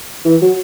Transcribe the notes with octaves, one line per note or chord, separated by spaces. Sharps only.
E3
F#3